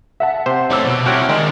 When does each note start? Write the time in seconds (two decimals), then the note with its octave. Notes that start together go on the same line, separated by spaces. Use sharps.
0.20 E5 F#5 A5
0.46 C3 C5
0.70 A3 D#4 C#5 D6 E6
0.84 B2
1.06 C4 E4 F#4 G4 C#5 F6 F#6 D7
1.29 D#3 G#3 D4 D#4